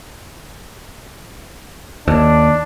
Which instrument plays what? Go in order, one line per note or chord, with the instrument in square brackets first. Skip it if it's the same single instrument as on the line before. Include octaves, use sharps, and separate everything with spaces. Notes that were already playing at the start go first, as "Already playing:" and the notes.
[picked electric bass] D#2 [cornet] D4